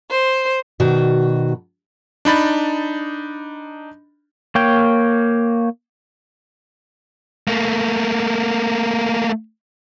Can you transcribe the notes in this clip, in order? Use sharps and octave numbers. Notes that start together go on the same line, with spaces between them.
C5
B2 D#3 F#4 D5
D4 D#4 B5 A6
A#3 C#5 G5
A3 A#3